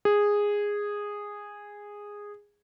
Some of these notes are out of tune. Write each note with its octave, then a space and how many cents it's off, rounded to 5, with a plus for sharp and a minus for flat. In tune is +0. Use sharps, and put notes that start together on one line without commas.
G#4 -10